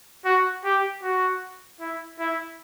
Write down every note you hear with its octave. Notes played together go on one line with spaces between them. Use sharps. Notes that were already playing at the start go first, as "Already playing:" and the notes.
F#4
G4
F#4
E4
E4